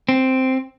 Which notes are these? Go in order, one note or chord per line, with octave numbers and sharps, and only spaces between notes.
C4